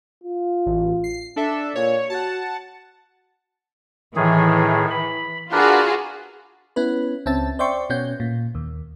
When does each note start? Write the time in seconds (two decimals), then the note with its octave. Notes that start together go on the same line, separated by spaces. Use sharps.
0.24 F4
0.66 A1
1.04 C7
1.36 D4 A4 E5
1.75 A#2 C#5
2.10 F#4 F#5 A5
4.16 A2 D#3 E3 G#4
4.91 B5
5.52 D4 F4 F#4 G#4 A#4 B4
6.76 B3 C#4 E4 B4
7.26 C#2 C4 C#4 E5 A5 A6
7.59 C5 D5 E5 G5 C6 C#6
7.90 B2 B3 C#4 G6
8.20 A#2
8.55 D#2